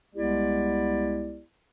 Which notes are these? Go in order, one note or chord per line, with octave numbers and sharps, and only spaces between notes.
C2 G#3 B3 E4 G4 D5